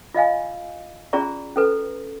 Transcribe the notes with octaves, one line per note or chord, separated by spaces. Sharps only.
F4 D#5 F5 G#5
C#4 F4 G#4 D5 A#5 C#6
C#4 A4 B4